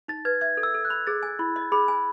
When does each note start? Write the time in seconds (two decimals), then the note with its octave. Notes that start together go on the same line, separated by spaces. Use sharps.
0.08 D#4 A6
0.25 B4 G#6
0.41 E5 G#6
0.57 A4
0.63 E6
0.74 A4
0.85 F#6
0.90 B5
1.07 G#4 A6
1.23 G#5
1.39 E4 B5
1.56 D#5
1.72 G#4 B5
1.88 G#5